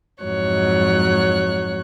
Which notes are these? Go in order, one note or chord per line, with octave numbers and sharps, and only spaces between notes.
F2 G#2 F#3 C#5 F#6